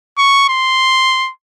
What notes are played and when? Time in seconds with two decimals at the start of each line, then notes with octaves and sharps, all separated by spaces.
0.18 C#6
0.49 C6